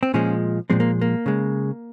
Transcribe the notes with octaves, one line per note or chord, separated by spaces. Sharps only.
C4
A#2 F3 G#3 C#4
A#2 F3 G#3 C4
A#3
A#3
C#3 G#3